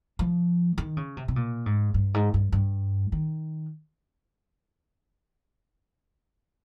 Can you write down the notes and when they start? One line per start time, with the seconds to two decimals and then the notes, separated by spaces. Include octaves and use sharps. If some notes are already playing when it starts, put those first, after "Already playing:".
0.19 F3
0.78 D#3
0.97 C#3
1.17 C3
1.28 C3
1.36 A#2
1.66 G#2
1.94 G2
2.14 G#2
2.34 G2
2.52 G2
3.12 D#3